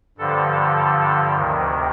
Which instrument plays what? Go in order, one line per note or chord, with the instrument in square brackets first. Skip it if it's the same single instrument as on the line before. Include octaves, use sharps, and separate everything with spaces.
[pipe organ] G2 D3 F3 A4
D2 C3 D#3